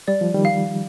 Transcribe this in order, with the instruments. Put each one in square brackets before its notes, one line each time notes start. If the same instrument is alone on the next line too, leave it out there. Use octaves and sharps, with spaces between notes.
[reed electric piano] G3 [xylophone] D5
[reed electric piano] F3
D#3 G3
[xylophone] F5